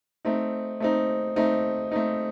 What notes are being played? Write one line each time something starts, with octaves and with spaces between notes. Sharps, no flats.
A3 C4 D#4
A3 C4 D#4
A3 C4 D#4
A3 C4 D#4